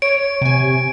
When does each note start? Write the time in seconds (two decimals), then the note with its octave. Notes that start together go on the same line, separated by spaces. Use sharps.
0.02 C#5 D7
0.41 C3 G#5